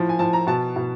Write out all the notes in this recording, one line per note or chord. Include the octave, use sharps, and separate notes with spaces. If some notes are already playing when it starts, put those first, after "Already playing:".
Already playing: A2 F3
G#5
A2 F3 A5
A#5
B2 A5
B2